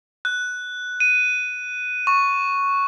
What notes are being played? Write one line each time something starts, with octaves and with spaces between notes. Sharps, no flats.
F#6
D#7
C#6